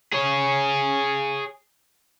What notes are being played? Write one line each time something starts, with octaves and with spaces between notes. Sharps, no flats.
G#4 C#5